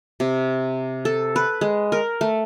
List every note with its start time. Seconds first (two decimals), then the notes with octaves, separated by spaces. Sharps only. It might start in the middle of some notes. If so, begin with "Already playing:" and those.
0.20 C3
1.05 A4
1.36 B4
1.61 G#3
1.92 A#4
2.21 A3